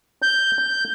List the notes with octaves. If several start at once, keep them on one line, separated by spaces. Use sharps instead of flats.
G6
G6